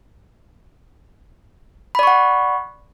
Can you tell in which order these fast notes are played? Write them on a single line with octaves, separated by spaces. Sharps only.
B5 D5 C#6 F#5